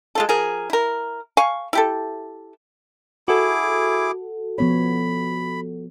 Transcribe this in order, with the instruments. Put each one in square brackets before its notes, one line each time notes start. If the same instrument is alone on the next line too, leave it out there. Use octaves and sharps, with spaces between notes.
[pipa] G#3 F4 A4
F3 G#4 A#4
E4 A#4
F5 G#5 C#6
E4 G4 A4
[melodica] E4 G#4 D6 [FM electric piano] F#4 A4
[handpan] F3 B3 C#5 [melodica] B5